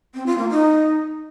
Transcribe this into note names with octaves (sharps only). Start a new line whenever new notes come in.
C4
F4
A#3
D#4